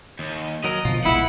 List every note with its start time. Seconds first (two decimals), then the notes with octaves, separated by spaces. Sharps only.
0.19 D#2
0.64 F#3 A#4 D#5
0.85 B2 D3 F3 B3 F4
1.05 E1 A#1 F3 G#3 B3 E4 F#5